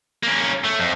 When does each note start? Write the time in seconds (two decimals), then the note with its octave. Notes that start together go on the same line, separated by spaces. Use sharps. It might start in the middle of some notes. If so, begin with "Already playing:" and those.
0.23 A#3 C#4
0.64 A3
0.79 F2